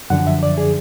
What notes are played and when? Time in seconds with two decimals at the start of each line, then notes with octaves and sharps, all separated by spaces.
0.10 F#2 D3 F3 F#5
0.27 E5
0.43 D5
0.58 G#4